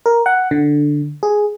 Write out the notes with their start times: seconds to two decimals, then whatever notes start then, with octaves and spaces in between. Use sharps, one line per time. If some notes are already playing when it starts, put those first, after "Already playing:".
0.06 A#4
0.26 F#5
0.51 D3
1.23 G#4